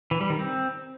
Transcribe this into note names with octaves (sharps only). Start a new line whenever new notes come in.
E3
G3
D#3
C4